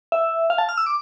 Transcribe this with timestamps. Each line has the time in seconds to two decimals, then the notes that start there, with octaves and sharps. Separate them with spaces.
0.12 E5
0.50 F5
0.58 A5
0.69 F6
0.77 E6
0.86 D6